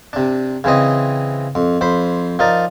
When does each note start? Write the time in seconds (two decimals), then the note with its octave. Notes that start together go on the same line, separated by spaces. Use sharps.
0.13 C3 D4
0.64 C#3 E3 C4 D#5
1.55 F2
1.81 F2 C5 B5
2.39 F3 D#4 A#4 D5